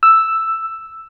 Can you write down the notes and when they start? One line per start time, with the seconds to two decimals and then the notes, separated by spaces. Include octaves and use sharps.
0.03 E6